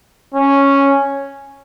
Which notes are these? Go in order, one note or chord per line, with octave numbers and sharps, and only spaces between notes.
C#4